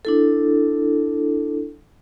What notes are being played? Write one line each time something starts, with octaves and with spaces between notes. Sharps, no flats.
D4 E4 A4